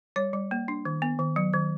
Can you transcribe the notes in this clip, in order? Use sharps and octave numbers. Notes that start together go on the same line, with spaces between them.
G3 C#5
G3
A#3
D4
D#3
B3
D#3
F#3
D#3